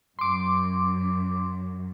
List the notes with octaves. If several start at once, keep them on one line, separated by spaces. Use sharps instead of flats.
F#2 C6 D6